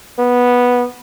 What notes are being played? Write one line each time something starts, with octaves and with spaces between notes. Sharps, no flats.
B3